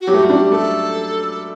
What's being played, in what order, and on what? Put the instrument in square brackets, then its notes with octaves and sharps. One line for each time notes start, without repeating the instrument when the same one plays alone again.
[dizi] F#4
[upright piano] F#3 [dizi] G4
[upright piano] A3
G3
[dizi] F#4
[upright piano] D4
[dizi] G4
[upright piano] A3 [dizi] A4